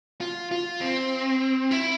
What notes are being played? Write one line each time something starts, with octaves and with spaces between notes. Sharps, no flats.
F4
F4
C4
E4